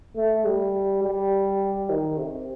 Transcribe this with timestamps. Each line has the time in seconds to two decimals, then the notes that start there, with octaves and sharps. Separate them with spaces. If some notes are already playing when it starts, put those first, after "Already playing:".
0.16 A3
0.45 G3
1.03 G3
1.89 D#3
2.18 C3